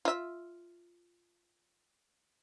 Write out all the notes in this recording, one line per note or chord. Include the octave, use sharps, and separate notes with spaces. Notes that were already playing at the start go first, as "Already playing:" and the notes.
F4 E5